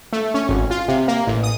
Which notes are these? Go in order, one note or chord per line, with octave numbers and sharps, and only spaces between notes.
A3
C#4
G#1
F4
C3
A#3
A1
D#6